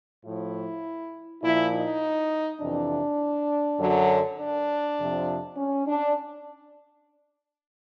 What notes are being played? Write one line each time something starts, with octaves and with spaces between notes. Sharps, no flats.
A2 F3 E4
A#2 F3 E4
D#4
F2 C3 E3 D4
F#2 D3 F#3
D4
F2 C3 F3
C#4
D4